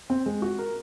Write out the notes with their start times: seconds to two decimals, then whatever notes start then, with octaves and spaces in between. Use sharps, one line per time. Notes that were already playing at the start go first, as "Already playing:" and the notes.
0.10 C4
0.26 G#3
0.42 F#4
0.59 A#4